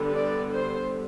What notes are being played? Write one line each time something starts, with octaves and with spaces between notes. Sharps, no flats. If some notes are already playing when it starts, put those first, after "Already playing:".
Already playing: D3 G3 B3
D5
C5